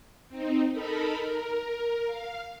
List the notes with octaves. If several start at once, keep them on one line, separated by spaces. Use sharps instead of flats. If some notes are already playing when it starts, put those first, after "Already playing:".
C4 D#4
D#4 A4 A#4 B5
A#4
F5